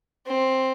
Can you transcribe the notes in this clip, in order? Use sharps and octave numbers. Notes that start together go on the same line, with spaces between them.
C4